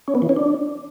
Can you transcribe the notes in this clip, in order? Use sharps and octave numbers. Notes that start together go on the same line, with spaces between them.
C#4
B3
E3
C#4
D4